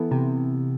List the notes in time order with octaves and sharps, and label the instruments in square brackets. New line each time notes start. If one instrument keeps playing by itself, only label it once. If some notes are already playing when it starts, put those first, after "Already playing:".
Already playing: [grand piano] E3 B3 E4 A4
[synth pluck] C3